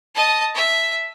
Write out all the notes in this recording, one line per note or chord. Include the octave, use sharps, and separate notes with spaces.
D#5 A5
E5